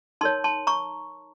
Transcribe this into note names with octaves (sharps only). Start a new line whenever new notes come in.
D#4 A#4 C#5 A5 C6
A5 C6
A#5 C#6